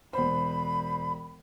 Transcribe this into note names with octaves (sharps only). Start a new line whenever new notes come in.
E1 C5 B5